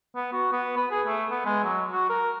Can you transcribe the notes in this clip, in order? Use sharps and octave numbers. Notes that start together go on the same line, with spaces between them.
B3
F#4
B3
B4
G#4
A3
B3
G#3
F#3
F#4
A#4